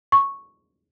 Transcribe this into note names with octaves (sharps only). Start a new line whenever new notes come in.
C#6